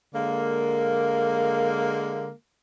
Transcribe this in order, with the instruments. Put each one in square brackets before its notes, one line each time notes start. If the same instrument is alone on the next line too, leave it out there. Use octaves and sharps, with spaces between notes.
[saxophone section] D3 G#3 A#3